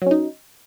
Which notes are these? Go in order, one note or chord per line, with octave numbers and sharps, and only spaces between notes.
F#3 C#4 D#4